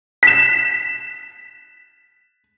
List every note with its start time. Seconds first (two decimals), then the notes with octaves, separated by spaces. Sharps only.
0.23 B6 E7